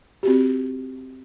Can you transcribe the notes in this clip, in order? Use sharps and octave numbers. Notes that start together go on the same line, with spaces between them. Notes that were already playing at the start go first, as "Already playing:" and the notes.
C4 F#4 G4